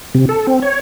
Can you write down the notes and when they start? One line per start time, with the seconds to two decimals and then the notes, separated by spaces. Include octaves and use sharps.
0.15 C3
0.29 A4
0.47 C4
0.62 C#5